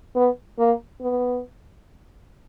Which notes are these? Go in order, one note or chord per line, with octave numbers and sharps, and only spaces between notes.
B3
A#3
B3